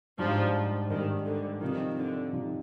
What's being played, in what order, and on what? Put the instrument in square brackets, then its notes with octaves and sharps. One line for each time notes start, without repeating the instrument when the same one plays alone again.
[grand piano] G#2 G3 D4 [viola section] F3
[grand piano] G#2 G3 D4 [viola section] D#3
[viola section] D3
[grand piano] C3 F3 C4 D#4 [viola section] D#3
[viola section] D3
[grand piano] C3 F3 C4 D#4